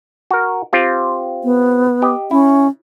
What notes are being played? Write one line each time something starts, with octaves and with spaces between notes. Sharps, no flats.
F#4 A#4
C4 F4 G4
B3
G4 D#5
C#4 E4